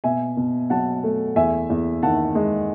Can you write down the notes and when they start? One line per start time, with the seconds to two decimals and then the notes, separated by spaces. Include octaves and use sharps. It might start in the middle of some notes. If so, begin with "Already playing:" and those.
0.04 B2 E5 G#5
0.37 B2
0.70 F#3 F#5 A5
1.04 A3
1.36 E2 E5 G#5
1.70 E2
2.03 D#3 F#5 A5
2.35 G#3